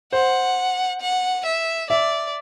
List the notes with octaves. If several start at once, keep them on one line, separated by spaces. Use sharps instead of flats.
C5 F#5
F#5
E5
D5 E5